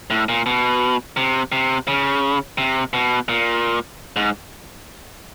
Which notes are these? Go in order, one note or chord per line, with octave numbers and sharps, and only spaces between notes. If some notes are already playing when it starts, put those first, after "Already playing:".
A2
A#2
B2
C3
C3
C#3
C3
B2
A#2
G#2